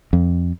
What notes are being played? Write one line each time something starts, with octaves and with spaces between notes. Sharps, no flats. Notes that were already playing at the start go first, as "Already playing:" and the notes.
F2